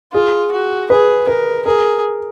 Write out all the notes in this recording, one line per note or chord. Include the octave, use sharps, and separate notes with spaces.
F4 G#4
F#4
G#4 B4
A#4 B4
G#4 A#4